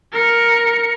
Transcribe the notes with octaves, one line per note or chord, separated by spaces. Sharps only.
A#4 C#7